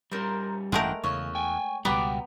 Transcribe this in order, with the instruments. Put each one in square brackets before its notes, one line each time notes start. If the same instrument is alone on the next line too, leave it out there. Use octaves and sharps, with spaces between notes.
[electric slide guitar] G3 C#4 [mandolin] A#4 C5
[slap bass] A1 G2 [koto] G#3 A3 A#4 [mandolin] F#5 G5
[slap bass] E2 [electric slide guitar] C#3 [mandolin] C#5
[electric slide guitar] G5 G#5
[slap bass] C#2 B2 G3 [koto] B3 [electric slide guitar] F#5 G5 A#5 [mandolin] D6